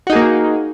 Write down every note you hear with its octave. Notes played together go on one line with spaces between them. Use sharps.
A#3 D#4 F#4 G#4